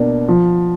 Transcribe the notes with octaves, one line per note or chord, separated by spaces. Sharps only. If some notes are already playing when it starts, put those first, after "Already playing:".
Already playing: B2 A#3 D4
F3